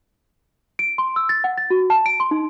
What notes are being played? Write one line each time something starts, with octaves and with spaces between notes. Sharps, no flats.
D7
C6
E6
A6
F#5
A6
F#4
A5
D7
C6
D#4